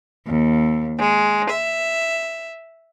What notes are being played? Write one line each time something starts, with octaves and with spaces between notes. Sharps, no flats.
D#2
G#3
E5